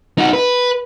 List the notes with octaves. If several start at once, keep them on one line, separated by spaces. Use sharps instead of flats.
D#4 F#4
B4